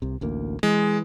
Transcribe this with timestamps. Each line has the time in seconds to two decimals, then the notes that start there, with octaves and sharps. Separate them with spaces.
0.02 C2 C3
0.21 A1 D2 A#3
0.63 E3 G#3